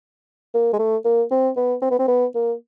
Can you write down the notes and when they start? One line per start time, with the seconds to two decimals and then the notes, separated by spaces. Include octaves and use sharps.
0.54 A#3
0.73 G#3
0.79 A3
1.05 A#3
1.31 C4
1.56 B3
1.82 C4
1.91 B3
1.99 C4
2.08 B3
2.35 A#3